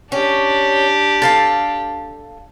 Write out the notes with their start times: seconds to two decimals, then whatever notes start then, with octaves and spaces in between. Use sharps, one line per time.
0.12 C#4 D4 G4
1.22 A4 F5 A5